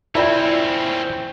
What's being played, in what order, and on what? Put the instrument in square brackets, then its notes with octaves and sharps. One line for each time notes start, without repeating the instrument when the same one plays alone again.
[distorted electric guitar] C4 C#4 [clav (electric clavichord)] E4 G5 [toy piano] F4 D5 E5